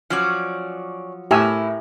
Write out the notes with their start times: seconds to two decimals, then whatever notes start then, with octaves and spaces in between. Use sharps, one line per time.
0.10 F3 F#3 C#4 C#5 D5
1.31 A2 E4 G4 A#4 G#5 E6